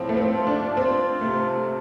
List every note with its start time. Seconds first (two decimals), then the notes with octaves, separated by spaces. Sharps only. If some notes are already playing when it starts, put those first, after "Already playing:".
Already playing: A2 F3 C4 F4
0.09 A3
0.17 C4
0.32 F4
0.47 D4
0.76 C4 F4
1.21 C3 A3